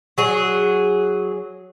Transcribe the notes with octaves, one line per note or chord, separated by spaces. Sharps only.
F#3 G#4